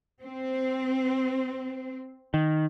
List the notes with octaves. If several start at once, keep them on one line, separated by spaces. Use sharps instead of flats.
C4
D#3